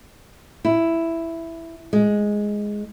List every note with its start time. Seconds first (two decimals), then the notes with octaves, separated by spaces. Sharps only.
0.65 E4
1.93 G#3